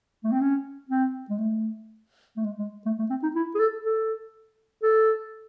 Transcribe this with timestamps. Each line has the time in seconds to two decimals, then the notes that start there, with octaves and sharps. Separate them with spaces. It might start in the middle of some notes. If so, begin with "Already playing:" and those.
0.24 A3
0.32 C4
0.41 C#4
0.89 C4
1.30 G#3
1.38 A3
2.37 A3
2.44 G#3
2.58 G#3
2.86 A3
2.99 A3
3.10 C4
3.23 D#4
3.35 E4
3.55 G#4
3.59 A4
3.84 A4
4.83 A4